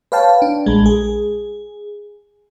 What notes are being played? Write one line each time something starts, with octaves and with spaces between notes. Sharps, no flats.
B4 C#5 F5 G5 A5
D4
A#1 G#3
G#4